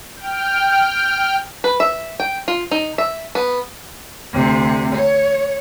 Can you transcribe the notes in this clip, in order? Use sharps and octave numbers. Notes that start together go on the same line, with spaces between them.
G5 F6
B4
E5
G5
F4
D#4
E5
B3
D2 C3
C#5